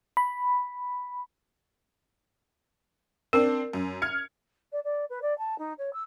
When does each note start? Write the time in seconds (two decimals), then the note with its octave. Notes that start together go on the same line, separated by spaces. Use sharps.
0.17 B5
3.33 C4 D4 A#4
3.73 F#2
4.02 F6 G#6 C#7
4.72 D5
4.84 D5
5.09 B4
5.22 D5
5.38 A5
5.58 D#4
5.78 C#5
5.93 E6